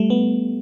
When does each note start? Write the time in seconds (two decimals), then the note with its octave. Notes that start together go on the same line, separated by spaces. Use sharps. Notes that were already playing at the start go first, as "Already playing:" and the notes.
Already playing: G3 A3
0.10 B3